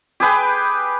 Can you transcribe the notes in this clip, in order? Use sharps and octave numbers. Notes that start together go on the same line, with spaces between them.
G4 G#4 B4 G5